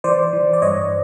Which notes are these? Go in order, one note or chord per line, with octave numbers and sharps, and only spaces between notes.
E3 C5 D5
E3
D5
G2 C#5 D#5